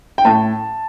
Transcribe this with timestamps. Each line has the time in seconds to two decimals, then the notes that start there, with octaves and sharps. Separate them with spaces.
0.18 G5
0.25 A2 A5